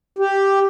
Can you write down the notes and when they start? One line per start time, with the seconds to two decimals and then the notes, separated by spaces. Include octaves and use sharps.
0.19 G4